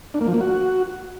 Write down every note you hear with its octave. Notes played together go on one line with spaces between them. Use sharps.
D4
A#3
F3
A#3
F#4